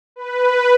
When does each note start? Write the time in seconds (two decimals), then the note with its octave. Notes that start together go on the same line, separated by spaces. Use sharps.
0.16 B4